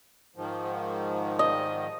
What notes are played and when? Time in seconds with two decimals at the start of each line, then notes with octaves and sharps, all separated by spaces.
0.36 G#2 D#3 F3
1.39 D#5